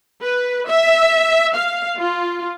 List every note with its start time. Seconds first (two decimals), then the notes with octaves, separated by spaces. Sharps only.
0.21 B4
0.68 E5
1.53 F5
1.99 F4